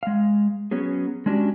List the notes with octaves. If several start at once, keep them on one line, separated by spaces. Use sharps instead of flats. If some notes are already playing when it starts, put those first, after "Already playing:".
G#3 F5
F#3 B3 C#4 G#4
G#3 C#4 D4 F#4 G4